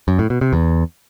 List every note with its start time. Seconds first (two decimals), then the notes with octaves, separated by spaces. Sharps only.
0.08 F#2
0.19 A2
0.30 B2
0.41 C3
0.53 E2